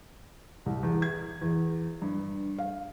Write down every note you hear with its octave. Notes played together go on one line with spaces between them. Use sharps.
C2
E2
G#6
E2
G2
F5